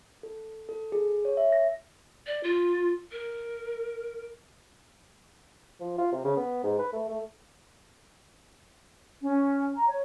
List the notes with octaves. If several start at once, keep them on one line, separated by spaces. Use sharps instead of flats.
A4
A4
G#4
C#5
E5
A#6
D5
F4
A#4
F3
F4
C3
C#3
B3
G#2
B4
A3
A3
C#4
A#5
C#5